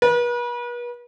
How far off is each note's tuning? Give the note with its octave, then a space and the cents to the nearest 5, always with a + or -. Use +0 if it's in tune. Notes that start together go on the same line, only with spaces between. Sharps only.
B4 -40